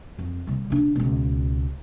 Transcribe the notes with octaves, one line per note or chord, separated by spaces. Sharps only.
F2
C3 G3
C3 D4
C#2 B2